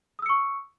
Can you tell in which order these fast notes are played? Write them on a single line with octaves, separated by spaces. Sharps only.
D#6 E6 C#7 C#6